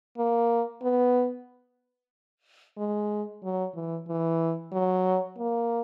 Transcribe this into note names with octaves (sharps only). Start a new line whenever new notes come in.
A#3
B3
G#3
F#3
E3
E3
F#3
A#3